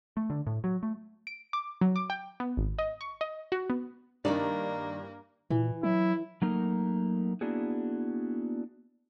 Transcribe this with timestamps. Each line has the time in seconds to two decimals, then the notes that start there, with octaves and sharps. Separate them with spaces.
0.17 A3
0.30 D3
0.47 A2
0.64 F#3
0.83 A3
1.27 D7
1.53 D6
1.81 F#3
1.96 D6
2.10 G5
2.40 B3
2.57 G#1
2.79 D#5
3.01 C#6
3.21 D#5
3.52 F#4
3.70 B3
4.25 G2 D#3 A#3 D4 D#4 D5
5.50 A#2 E3
5.83 F#3 E4
6.42 F#3 A3 A#3 D#4 A#4
7.41 A#3 B3 D4 E4 F#4 G#4